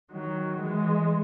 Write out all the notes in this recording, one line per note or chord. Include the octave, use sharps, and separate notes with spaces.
D#3 F#3
E3 G#3